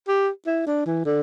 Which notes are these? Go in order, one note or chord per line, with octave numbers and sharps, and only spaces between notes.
G4
E4
D4
E3
D3